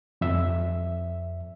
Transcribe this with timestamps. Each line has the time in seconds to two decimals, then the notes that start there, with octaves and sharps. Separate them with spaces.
0.21 F2 E5